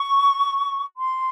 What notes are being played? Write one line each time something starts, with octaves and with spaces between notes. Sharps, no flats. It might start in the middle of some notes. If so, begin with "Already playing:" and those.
Already playing: C#6
C6